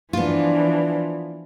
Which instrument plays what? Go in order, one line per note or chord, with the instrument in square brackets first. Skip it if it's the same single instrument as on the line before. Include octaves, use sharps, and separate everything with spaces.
[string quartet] E3 F3 D4 [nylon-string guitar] B3 F4